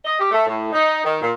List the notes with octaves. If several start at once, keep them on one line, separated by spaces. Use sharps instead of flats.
D#5
G4
A3
A2
D#4
D#3
A#2